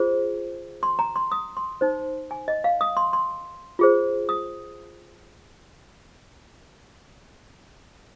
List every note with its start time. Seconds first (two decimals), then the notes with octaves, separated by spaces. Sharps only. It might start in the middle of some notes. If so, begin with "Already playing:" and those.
Already playing: F4 G#4 C5
0.83 C6
0.99 A#5
1.16 C6
1.32 D#6
1.57 C6
1.81 D#4 C5
2.31 G#5
2.48 D#5
2.64 F5
2.81 D#6
2.97 C6
3.13 C6
3.79 F4 G#4 C5
4.29 D#6